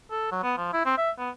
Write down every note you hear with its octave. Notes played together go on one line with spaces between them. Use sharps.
A4
F#3
B3
F3
E4
C4
E5
B3